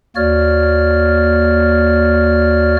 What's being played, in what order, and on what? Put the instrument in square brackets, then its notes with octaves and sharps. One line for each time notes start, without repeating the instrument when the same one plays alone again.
[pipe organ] D#2 A#3 F#4 C#5 D5 F6